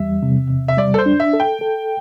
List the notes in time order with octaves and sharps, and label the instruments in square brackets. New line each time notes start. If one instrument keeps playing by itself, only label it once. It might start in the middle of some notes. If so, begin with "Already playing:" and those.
Already playing: [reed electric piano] E2 G3 [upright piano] E5
[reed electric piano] C3
E2
[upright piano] E5
[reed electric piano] G3 [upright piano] D5
[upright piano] A4
C5
[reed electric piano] D4
[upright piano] E5
[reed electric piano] A4
[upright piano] G5
[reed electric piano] A4